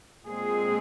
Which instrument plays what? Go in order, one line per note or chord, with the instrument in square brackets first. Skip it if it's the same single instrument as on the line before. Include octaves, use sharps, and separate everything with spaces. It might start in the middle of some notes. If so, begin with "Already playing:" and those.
[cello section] A#2 G#3 C4 G#4